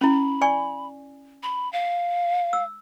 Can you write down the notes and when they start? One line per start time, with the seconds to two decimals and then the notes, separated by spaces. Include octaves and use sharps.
0.01 C#4 E4 B5
0.41 D5 G#5 C#6
1.43 B5
1.73 F5
2.53 E6